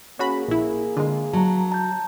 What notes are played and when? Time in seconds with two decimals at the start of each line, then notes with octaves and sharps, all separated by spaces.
0.19 A#3 C#4 F#4 G#4 B5
0.48 A#1 E4
0.97 D3 G#3 F4
1.33 F#3 A5 A#5
1.72 A5 A#5 G6